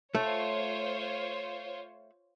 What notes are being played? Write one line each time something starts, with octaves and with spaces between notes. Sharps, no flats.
A3 F4 C5 C#5